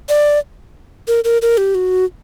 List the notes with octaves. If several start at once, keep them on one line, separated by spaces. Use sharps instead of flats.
D5
A#4
A#4
A#4
G4
F#4